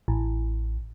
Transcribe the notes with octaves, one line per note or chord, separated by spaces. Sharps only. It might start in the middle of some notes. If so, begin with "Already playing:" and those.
A1